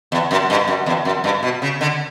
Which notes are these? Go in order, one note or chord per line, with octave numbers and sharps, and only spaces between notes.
E2
F#2
G2
F#2
E2
F#2
G2
B2
C#3
D3